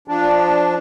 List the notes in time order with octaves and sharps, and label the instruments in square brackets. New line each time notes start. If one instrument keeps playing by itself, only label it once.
[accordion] F3 D4